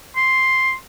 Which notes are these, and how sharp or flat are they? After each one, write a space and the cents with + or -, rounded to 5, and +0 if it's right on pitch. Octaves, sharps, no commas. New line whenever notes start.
C6 +5